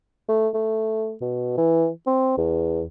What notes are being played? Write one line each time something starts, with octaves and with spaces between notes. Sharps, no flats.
A3
A3
B2
E3
C4
E2